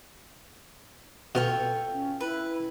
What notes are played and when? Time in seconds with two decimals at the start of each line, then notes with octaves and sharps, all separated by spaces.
1.35 B2 F4 A4 C#5 G5
1.93 C#4
2.20 E4 B4